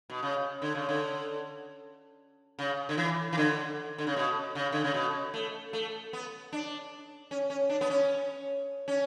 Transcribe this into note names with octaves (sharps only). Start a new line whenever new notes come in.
B2
C#3
D3
C#3
D3
C#3
D3
E3
E3
D3
D3
C#3
B2
C#3
D3
C#3
B2
A3
A3
B3
D4
C#4
C#4
D4
B3
C#4
C#4